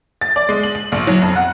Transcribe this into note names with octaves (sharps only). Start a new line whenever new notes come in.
A6
D5
G#3
F#7
F#7
A#1
F#3
F2
F#5